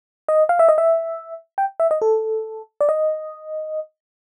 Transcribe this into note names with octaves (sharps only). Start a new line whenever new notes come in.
D#5
F5
E5
D#5
E5
G5
E5
D#5
A4
D5
D#5